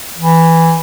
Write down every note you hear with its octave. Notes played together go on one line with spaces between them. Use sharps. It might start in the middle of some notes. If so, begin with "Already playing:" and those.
E3